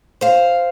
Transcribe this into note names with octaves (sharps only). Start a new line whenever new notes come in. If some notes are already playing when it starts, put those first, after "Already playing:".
C5 F5